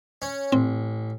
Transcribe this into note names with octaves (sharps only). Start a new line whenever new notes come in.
C#4
A1 C4